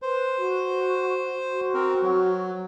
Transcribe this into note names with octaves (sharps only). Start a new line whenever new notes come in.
B4 C5
F#4
F#4
C4 A#4
F#3